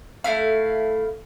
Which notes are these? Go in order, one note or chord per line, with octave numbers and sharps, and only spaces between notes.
A3 E4 F5